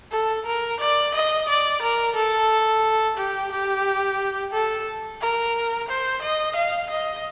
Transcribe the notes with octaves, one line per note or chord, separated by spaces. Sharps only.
A4
A#4
D5
D#5
D5
A#4
A4
G4
G4
A4
A#4
C5
D#5
F5
D#5